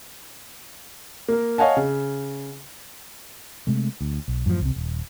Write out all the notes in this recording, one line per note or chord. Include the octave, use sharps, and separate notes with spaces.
A#3 A#4
C#5 D#5 F5 F#5 G#5 A5
C#3
C3 G#3 A3
D2
B1
F#2 A2 C#3 F3
C2 C3
D#1